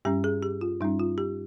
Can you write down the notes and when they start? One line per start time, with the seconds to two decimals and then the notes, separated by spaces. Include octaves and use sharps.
0.05 G2 G3 C#4 G4
0.24 G#4
0.42 G4
0.61 F4
0.80 G2 G3 C#4 D#4
0.99 F4
1.18 G4